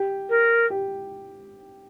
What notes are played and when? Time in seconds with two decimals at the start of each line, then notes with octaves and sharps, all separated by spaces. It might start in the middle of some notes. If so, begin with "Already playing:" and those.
Already playing: G4
0.29 A#4
0.70 G4